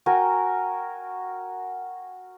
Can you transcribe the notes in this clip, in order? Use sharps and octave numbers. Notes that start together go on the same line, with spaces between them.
F#4 A#4 G5 G#5